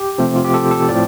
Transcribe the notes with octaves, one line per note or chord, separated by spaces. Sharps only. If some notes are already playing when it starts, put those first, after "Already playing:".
Already playing: G4
C3 F3 A3 C4
F4
G4
A4
A4
A2 F3 C4 D5